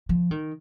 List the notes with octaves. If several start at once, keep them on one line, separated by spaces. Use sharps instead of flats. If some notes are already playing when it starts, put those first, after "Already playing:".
F3
D#3